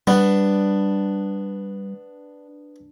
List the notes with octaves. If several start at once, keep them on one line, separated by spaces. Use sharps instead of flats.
G3 B3 D4